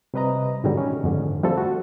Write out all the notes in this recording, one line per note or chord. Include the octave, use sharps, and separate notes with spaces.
C3 G3 B4 D#5 A#5
G#2 B2 D3 D#3 F#3 G3
C#4
F2 G#2 D3 D#3
F3 G3 A3 C4 A4
F#4